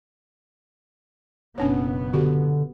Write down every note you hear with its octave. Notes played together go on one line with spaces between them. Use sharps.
F#1 B2 B3 C#4 D4 C#5
D3 F#4 G4